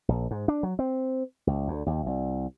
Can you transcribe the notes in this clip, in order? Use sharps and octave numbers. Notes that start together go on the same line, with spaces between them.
A#1
G#2
D4
F#3
C4
C#2
D2
D#2
C2